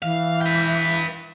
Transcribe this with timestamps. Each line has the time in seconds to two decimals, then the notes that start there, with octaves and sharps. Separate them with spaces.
0.02 E3 F5
0.41 B4 G5